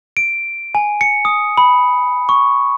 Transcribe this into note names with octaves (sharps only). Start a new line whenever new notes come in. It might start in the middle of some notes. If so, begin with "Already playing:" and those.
D7
G#5
C#7
D#6
B5
C#6